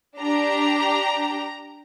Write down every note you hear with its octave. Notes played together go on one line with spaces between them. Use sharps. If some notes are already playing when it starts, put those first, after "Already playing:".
D4 G4 A#5